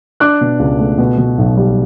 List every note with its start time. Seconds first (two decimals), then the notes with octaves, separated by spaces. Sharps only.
0.20 D4 D6 F#6
0.41 B2
0.59 C#2
0.79 A3
0.98 B2
1.18 B2
1.38 B1
1.57 G3